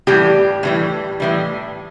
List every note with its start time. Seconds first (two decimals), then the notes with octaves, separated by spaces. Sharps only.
0.07 A2 E3 G3 G4
0.63 A2 E3 G3
1.20 A2 E3 G3